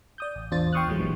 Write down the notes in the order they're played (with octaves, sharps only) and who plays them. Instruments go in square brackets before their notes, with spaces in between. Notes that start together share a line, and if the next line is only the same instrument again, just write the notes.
[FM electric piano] D5 D#6 G6
A1
A1 E2 D4 F4 C5 A6
G5 C6 C#6 D#6 F6 F#6
D2 A2 D3 E3 F#3 G#3
G1 A#2 E3 G3